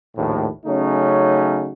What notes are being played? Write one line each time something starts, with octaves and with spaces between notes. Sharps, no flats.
A#1 D#2 A2
C#3 F#3 A3 C#4 D#4